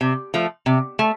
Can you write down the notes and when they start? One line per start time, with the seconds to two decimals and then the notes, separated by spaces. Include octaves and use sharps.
0.01 C3
0.34 F3 A3
0.66 C3
0.99 A3